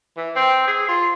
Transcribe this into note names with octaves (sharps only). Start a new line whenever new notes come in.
E3
C4
G#4
F4